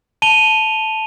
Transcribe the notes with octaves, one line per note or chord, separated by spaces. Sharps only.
A5 D#7 F7 G7